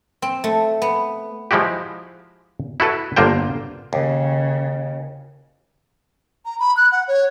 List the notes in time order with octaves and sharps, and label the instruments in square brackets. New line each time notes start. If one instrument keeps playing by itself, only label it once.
[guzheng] C4
A3
B3
[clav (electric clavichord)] F3 G#3 E4 F#4 G4
E4 F#4 A4 B4
G1 D3 A#3 F4 C5 G5
[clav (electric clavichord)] D#2 [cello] C#3
[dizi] A#5
B5
F#6
F#5
C#5